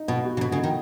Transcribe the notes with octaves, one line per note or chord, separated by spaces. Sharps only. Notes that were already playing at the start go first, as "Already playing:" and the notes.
Already playing: D#4
B2 B3
F#4
C#3
B2 B3
C#3
D#4
D#3